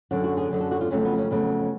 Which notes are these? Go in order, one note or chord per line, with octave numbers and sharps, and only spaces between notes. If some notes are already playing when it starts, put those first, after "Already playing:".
F#2 D3 F#3 F#4
F#4
G#4
F#2 D3 F#3
A4
F#4
F4
F2 C#3 F#3 A3 C#4
B3
C#4
F2 C#3 F#3 A3 B3